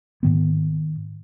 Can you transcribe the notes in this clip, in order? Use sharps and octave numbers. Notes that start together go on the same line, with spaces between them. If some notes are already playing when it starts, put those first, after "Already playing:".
G#2 D#3 B3